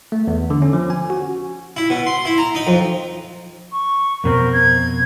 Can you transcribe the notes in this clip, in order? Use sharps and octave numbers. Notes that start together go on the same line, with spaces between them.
A3
E2
D3
C#4
F3
G#5
F#4
E4
B2
C6
E4
A#5
D#4
F2
C#6
F2 B2 C4 A#4
G#6